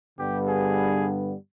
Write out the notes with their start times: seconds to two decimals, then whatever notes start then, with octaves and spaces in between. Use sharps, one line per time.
0.19 G2 D3 G3 B3 G4
0.48 G#4